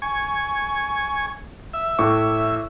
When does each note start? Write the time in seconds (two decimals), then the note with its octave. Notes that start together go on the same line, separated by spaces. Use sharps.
0.02 G#5 C#6
1.74 E5
1.99 A2 C#6 D6